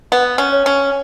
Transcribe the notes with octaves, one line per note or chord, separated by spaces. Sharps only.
B3 F#5
C#4
C#5
C#4